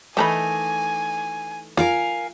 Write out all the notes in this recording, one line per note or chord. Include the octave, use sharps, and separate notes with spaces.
D#3 E3 A3 D#4 G#5 A#5 B5
F4 A#4 F5 G#5